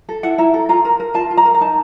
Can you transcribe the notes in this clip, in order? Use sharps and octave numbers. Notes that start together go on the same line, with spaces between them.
A4
E4 F#5
E4 A#5
A4
F4 A#5
A#4
A#4
F4 A5
F4
A#5
A#4
A#5
D#4 A5